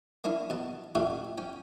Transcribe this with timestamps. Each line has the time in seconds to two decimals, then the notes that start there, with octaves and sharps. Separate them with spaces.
0.24 A#3 C#4 D4 E4
0.50 B2 A5
0.95 A1 A3 F4 F#4 E5 G5
1.38 C#4 G5